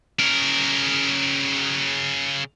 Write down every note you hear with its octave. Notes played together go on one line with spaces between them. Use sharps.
C#3 A#4